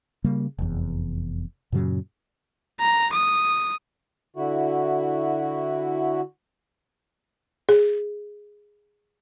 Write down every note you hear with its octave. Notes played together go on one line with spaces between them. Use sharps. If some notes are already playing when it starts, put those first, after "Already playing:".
C#3 G3 A#3
F1 E2
F#2 A#2 C#3 F#3
A#5
D#6
D3 E4 F#4
G#4